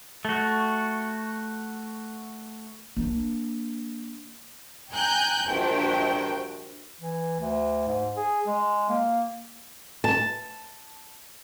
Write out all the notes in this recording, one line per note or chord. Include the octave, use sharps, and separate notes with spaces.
A3 F#4
A#3 D4
G5 G#5 A#5 F#6 G6
A#1 G2 F#4 G5
E3
D2
G#2
G#4
G#3
A#3
A5